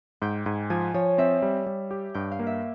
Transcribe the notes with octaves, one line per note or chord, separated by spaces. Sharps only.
G#2 G5
G#2 G#5
F3 G#5
F3 C#5
C4 E5
G3
G3
G4
G2 G5
F5
A#3
E5